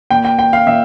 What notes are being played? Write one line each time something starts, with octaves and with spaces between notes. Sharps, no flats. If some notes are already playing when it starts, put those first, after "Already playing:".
A#2 G5
G5
G5
F5
A#2 E5